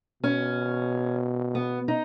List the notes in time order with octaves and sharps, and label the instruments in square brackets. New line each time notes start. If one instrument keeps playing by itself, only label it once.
[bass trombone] B2 [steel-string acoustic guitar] C#4
[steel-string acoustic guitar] B3
D#4